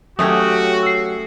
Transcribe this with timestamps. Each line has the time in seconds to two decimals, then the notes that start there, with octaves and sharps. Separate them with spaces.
0.19 F#3 A3 C#4 F#4 G4 D#6
0.83 E6 C7